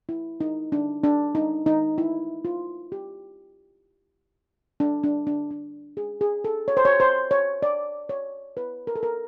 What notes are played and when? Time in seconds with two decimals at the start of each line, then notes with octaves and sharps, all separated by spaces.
0.09 E4
0.41 D#4
0.72 D4
1.04 D4
1.35 D#4
1.66 D#4
1.98 E4
2.45 F4
2.92 G4
4.80 D4
5.03 D4
5.27 D4
5.51 D4
5.97 G#4
6.21 G#4
6.44 A4
6.68 C#5
6.77 C5
6.85 C#5
7.00 C5
7.31 C#5
7.62 D5
8.09 C#5
8.57 B4
8.87 A#4
8.96 A4
9.03 A#4